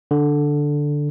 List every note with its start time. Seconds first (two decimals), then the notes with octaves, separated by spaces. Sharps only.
0.11 D3